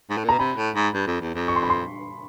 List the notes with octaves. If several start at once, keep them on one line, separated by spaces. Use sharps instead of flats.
G#2
A2
A#2
B2 A#5
C3 B5
A2
G#2
G2
F2
E2
F2
C#6
C6
B5
C6